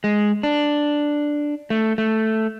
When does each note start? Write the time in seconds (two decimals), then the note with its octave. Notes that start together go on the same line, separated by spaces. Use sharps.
0.04 G#3
0.43 D4
1.70 A3
1.98 A3